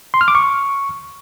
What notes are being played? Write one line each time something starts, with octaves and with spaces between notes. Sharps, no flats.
C6
F6
D6
C#6